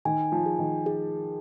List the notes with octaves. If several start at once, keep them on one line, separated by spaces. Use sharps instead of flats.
D#3 G#5
F3
G#4
D#3
G#4